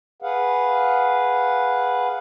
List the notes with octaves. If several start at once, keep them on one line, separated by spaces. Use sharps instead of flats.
G#4 B4 F5 F#5